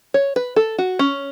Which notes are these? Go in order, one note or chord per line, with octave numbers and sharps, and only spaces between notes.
C#5
B4
A4
F#4
C#4